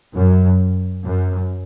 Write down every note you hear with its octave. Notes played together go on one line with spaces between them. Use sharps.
F#2
F#2